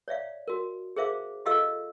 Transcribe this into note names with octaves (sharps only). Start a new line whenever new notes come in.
C#5 D5 E5 F5
F#4 A#4
G#4 A#4 C5 E5 F5 D6
F4 G4 A4 D#5 F5 E6